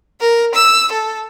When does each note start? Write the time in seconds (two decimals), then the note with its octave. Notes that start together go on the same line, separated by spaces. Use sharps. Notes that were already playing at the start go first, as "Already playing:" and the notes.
0.20 A#4
0.54 E6
0.92 A4